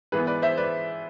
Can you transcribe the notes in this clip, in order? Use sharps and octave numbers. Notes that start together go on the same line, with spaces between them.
G#2 E3 G#3 B3 G#4 B4
B4 D5
C5 E5
B4 D5